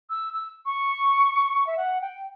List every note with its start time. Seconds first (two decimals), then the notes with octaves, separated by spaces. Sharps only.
0.10 E6
0.33 E6
0.66 C#6
1.67 E5
1.77 F#5
2.01 G5